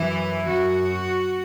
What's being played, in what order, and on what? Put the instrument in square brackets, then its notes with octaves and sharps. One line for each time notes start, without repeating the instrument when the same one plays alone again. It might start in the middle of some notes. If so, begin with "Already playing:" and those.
Already playing: [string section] F#2 E3 E4
F#2 F#4